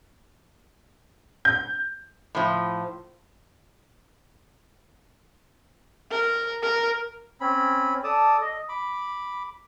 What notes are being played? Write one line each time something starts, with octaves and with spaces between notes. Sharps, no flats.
G6
A2 F3
A#4
A#4
C4 C#4 B5
A4 D5 A5 D#6
D#5
B5 D6